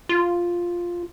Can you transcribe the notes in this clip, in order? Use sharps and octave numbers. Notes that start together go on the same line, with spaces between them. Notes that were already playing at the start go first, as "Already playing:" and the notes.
F4